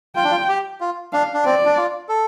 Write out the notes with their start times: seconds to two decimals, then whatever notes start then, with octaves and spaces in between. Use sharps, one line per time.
0.16 F4 G5
0.24 D4
0.31 F4
0.49 G4
0.81 F4
1.13 D4 F5
1.34 D4
1.45 C4 D5
1.66 D4
1.77 F4
2.09 A4